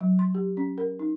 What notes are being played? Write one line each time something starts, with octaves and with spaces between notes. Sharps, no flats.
F#3
C6
G4
C#4
A#4
D#4